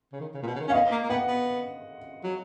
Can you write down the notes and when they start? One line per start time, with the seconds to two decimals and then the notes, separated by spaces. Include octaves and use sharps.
0.12 C#3
0.20 D#3
0.34 C#3
0.42 A#2
0.47 B2
0.55 C#3
0.60 D#3
0.68 C#4 F5
0.73 B3 D#5
0.91 A#3
1.03 A#3
1.10 B3 F#5
1.28 B3
2.23 F#3